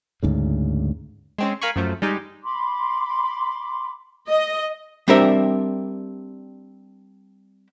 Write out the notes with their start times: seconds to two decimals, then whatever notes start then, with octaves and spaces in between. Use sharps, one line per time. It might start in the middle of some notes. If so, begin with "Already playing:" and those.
0.23 D2 G#2 C#3
1.38 G#3 C4 C#4
1.61 A#4 F5 G#5 B5 C#6
1.76 F#2 F3 A3
2.02 G3 G#3 D#4 G4
2.43 B5 C6 D6
4.30 D#5
5.08 G3 C4 D4 G4 A#4 E5